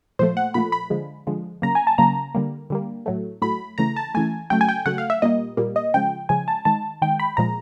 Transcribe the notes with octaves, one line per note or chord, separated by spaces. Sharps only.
A#2 F3 A3 C5
F#5
A#2 F3 A3 B5
B5
D3 F3 G#3
D3 F3 G#3
C#3 F#3 A#3 A#5
G#5
A5
C#3 F#3 A#3 A#5
D3 G3 A#3
D3 G3 A#3
A2 F#3 A3
A2 F#3 A3 B5
C#3 E3 A3 A#5
A5
C#3 E3 A3 G#5
C#3 F#3 A3 G5
G#5
G5
C#3 F#3 A3 F#5
F5
E5
A#2 G3 A#3 D#5
A#2 G3 A#3
D#5
C#3 F3 G#3 G5
C#3 F3 G#3 G#5
A5
D#3 G#3 A5
D#3 G#3 G5
B5
A#2 F3 G#3 A#5